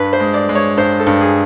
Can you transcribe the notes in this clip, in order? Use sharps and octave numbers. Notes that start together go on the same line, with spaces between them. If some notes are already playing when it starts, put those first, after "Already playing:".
Already playing: G2 B4
C5
G#3
D5
G#3
C#5
G2 C5
A4
G2
G#4